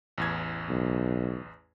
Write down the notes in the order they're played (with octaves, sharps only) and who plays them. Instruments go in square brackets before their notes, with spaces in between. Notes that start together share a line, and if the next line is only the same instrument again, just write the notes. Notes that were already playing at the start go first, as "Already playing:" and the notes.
[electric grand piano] A1 E2 G#6
[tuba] B1